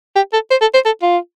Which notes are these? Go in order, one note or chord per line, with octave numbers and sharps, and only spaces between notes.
G4
A4
C5
A4
C5
A4
F4